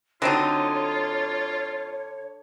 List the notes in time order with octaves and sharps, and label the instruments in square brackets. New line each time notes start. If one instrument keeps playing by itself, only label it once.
[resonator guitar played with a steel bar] D3 [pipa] F#3 C4 D#4 [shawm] F4 [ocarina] C#5